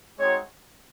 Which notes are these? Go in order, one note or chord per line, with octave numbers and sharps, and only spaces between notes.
G#3 C4 D#4 F#4 C#5